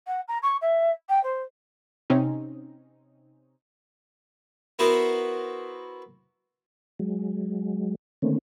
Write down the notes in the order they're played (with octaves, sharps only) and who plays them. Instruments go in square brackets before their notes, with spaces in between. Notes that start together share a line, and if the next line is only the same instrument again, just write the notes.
[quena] F#5
A#5
C#6
E5
G5
C5
[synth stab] C3 C4 C#4 D#4
[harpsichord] B3 E4 F#4 A#4 C5
[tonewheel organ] F#3 G#3
D3 D#3 A3 A#3 C4 C#4